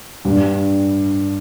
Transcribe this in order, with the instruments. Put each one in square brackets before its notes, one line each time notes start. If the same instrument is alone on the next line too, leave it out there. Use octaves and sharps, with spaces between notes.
[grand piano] G2 G3 D4